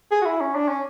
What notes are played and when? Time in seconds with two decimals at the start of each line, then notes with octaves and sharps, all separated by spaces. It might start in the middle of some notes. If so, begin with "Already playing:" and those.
0.11 G#4
0.22 F#4
0.25 E4
0.41 C#4
0.55 D4
0.68 C#4